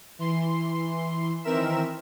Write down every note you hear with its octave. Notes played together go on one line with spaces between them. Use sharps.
E3 C6
D#3 E3 C4 A#4 E5 E7